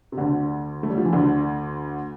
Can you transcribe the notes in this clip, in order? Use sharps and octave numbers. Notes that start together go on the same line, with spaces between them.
C3
D2 D3
A3
G3
F3
E3
D2 D3